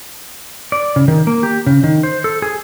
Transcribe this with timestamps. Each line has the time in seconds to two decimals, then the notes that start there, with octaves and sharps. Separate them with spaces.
0.72 D5
0.96 C#3
1.08 D#3
1.27 A#3
1.43 G4
1.66 C#3
1.84 D#3
2.03 C5
2.24 A4
2.42 G#4